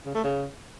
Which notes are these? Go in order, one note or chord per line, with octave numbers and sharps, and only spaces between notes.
C#3
A3
C#3